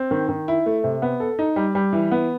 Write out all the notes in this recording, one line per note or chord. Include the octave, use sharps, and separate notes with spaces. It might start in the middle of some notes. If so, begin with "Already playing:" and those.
Already playing: C4
D#3
D#3
E4
A3
C3
B3
A4
D#4
G3
G3
E3
B3